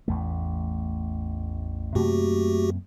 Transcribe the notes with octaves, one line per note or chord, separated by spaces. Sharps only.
A1 E2 A3
F#2 C3 A3 A#3 F#4 G4